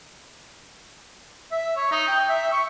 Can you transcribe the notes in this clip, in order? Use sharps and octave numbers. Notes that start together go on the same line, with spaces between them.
E5
C#5
D#4
G5
E5
C#6